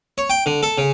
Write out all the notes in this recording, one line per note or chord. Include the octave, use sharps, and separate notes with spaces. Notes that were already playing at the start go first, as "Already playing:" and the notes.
C#5
G5
D3
A4
C#3